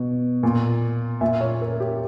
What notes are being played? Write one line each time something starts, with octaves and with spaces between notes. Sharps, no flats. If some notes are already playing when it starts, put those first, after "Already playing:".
Already playing: B2
A#2
A#2 E5
C#5
A#4
G4